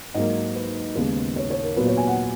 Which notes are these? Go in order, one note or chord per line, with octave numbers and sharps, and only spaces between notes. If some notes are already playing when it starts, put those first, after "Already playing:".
G#2 F#3 A#3 D#5
B4
D#2 C#3 G#3 B3
C#5
C#5
A#4
A#2 F#3 B3 B4
C#5
G#5
F#5